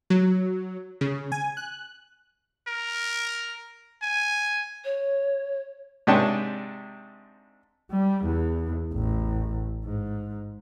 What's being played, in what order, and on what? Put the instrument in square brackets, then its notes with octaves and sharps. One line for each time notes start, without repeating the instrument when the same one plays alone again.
[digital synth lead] F#3
C#3
G#5
F#6
[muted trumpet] A#4
G#5
[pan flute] C#5
[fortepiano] G#2 C3 D4 C#5 G5 A5
[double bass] G3
E2
A1
G#2